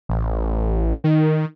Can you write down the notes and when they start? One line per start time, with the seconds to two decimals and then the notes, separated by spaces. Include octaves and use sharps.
0.09 A1
1.04 D#3